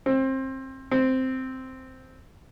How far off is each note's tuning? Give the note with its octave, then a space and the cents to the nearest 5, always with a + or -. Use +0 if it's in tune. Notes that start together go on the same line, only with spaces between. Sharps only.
C4 +25
C4 -5